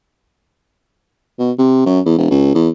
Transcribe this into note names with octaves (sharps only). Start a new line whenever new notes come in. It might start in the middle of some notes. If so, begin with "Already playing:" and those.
B2
C3
F#2
E2
E1
C#2
E2